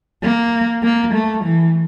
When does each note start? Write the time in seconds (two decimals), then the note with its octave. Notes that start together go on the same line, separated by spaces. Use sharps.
0.23 A#3
0.83 A#3
1.14 A3
1.44 E3